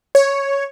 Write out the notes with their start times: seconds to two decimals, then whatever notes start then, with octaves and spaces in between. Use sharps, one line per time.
0.15 C#5